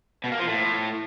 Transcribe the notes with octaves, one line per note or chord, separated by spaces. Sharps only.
B2
A#3
F3
A2